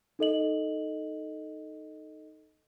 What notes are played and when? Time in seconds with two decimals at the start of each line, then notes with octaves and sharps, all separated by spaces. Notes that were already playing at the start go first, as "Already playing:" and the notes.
0.19 D#4 A4 D#5 F#7